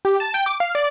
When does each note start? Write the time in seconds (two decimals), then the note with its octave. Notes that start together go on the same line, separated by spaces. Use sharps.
0.05 G4
0.20 A5
0.34 G5
0.46 D6
0.60 F5
0.75 D5